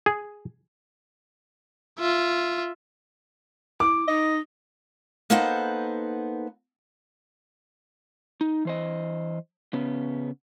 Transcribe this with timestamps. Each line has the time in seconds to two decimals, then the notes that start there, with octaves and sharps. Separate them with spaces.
0.06 G#4
1.99 F4 E5
3.80 E4 D6
4.08 D#4 D#5
5.30 A#3 B3 D#4 A4 C5 F#5
8.41 D#4
8.65 E3 C5 D#5
9.73 C#3 B3 C#4